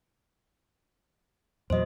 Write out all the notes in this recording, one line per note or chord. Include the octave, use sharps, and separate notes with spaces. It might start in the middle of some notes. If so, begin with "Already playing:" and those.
E2 A#2 F#3 C5 D#5